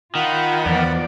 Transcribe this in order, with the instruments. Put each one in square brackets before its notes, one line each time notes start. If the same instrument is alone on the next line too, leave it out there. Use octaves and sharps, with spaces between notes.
[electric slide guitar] D#3 [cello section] F4 [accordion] F#5 B5
[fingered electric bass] E2 [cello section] F3 B3 D5